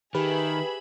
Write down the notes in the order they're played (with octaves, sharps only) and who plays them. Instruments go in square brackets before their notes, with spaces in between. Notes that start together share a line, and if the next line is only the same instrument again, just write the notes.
[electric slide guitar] D#3 [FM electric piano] G4 B4 [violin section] G#4 E5 B5